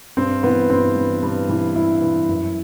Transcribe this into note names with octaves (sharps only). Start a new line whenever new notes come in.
G2 C4
E3 B3
G2 C4
E3
G2
E3
G2 E4
E3
F#2